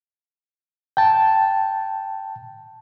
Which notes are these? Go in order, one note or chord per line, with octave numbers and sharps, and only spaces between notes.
G5 A5